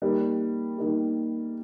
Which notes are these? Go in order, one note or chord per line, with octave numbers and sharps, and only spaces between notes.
D#3 G3 A#3
D#3 G3 A#3